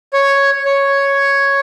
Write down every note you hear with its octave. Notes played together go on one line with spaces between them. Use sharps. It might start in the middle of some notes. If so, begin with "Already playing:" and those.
C#5
C#5